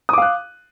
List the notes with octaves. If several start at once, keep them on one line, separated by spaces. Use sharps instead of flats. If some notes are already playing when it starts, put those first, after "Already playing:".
F5 D6 D#6 F#6